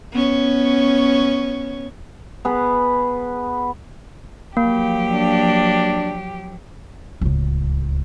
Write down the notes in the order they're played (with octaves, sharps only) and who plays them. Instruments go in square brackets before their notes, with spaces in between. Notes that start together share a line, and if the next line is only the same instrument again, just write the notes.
[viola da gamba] B3 C#4 C#5
[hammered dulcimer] B3 G#4 B4
[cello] F3 F#3 [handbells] A#3 [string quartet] G4
[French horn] D4
[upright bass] D1 C#2